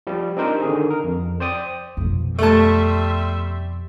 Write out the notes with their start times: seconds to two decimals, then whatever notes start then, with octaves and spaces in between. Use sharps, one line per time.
0.07 F3 G3
0.37 C4 D4 D#4 G4 A#4 C5
0.62 D3 D#3 G#4
0.91 A#4
1.04 F2
1.40 C5 D5 G5 D#6
1.97 F2 B2
2.39 G3 A3 E5 A5 C6